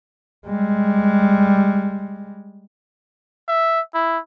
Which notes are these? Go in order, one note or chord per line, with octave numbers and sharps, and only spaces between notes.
G3 G#3
E5
E4